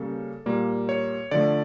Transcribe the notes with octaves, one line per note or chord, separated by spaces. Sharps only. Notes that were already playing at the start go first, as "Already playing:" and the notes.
Already playing: C#3 G3 A#3 A4
A#2 G3 A#3
C#5
D3 F3 A3 D5